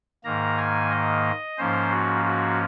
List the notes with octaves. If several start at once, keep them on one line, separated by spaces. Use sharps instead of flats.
G#2 D#3 A#3 A#5
G#5
D#5
G#2 F3 A#3 C#4 C5
F#4
F#4